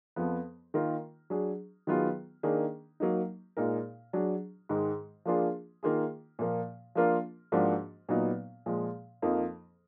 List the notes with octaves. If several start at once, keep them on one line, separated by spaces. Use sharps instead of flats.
F2 F3 B3
D#3 A#3 F4 A#4
F#3 D4 G#4
D#3 F#3 B3 F4 G#4
D#3 A#3 D4 G#4
F#3 A#3 D#4
A#2 G#3 D#4 A#4
F#3 D4 G#4
G#2 D#3 G#3
F3 A#3 D4 F4 G#4
D#3 A#3 F4 G#4
A#2 F3 A#3
F3 A#3 D4 F4 A#4
G#2 F3 A#3 D4 F#4
A#2 F#3 B3 D#4
A#2 F3 G#3
F2 F3 A#3 D#4